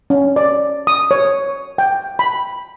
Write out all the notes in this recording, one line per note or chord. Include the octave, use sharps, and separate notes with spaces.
C#4
D5
D#6
C#5
G5
B5